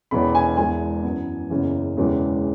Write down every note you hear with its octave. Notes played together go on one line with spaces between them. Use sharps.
E1 E2 E3 C#4 B5
G#5
E1 E2 E3 G#3 G#5
F#2 E3 B3
F#1 E2 C#3 E3
E1 E2 C#3 E3 G#3